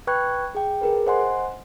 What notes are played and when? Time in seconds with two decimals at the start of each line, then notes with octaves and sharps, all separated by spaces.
0.07 B4 G5 B5 C#6 F#6 G#6
0.55 G#4 G5
0.81 G#4 A#4 B4
1.07 C5 D#5 F#5 G#5 C6